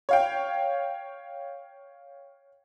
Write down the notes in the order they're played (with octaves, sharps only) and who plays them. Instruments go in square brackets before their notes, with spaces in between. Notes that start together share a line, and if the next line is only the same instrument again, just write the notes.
[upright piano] C#5 F5 G5